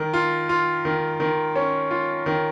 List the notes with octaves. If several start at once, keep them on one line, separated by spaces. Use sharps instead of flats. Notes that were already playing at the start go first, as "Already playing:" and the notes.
Already playing: D#3
F4
F4
D#3
D#3
C#4
F4
D#3